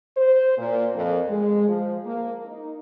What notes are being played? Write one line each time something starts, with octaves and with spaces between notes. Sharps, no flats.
C5
A#2
F2
G#3
F3
A#3
D#4